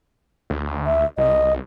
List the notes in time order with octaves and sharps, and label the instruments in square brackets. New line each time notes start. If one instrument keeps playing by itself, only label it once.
[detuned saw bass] D2
[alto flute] E5
[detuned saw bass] C2 [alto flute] D#5